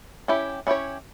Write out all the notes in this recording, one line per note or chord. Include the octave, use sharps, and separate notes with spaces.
C#4 E4 G4
C#4 E4 G4 C#5